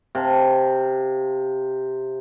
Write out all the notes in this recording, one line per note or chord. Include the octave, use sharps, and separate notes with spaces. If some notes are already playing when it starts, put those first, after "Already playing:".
C3 F5 A5